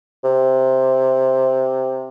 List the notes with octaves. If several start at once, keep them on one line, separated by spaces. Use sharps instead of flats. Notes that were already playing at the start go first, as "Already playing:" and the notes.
C3